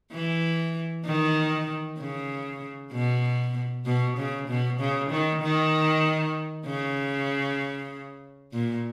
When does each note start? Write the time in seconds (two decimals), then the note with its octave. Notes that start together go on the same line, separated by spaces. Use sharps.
0.12 E3
1.05 D#3
1.99 C#3
2.92 B2
3.86 B2
4.17 C#3
4.48 B2
4.79 C#3
5.11 D#3
5.42 D#3
6.66 C#3
8.53 A#2